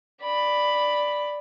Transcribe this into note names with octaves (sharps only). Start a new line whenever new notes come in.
D5 B5